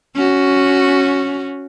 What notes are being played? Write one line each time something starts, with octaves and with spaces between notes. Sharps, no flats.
C#4 F#4